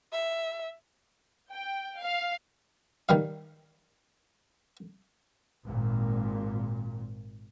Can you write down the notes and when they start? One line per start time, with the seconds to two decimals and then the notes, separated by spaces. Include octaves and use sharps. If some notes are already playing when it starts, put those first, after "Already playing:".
0.12 E5
1.51 G5
2.01 F5
3.09 D#3 G3 F5
5.65 G#1 A#2